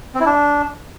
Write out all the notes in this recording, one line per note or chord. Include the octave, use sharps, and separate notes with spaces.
C4
E4
D4